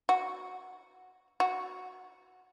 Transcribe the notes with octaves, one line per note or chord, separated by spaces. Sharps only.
F#4
F#4